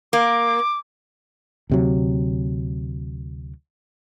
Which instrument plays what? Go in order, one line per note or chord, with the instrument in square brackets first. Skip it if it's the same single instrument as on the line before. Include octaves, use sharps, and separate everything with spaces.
[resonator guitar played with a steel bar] A#3 [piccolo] D6
[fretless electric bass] D2 C3 F#3